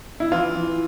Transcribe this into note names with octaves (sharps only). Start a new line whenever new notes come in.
E4
E3 F4
E3